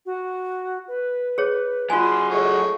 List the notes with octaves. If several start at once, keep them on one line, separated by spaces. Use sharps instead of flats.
F#4
B4
G#4 C#5
F#3 F4 G#4 G#5 C6
G#3 A3 C#5 C#6